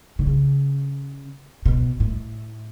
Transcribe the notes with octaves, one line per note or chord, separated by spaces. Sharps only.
D3
C#3
B2
A2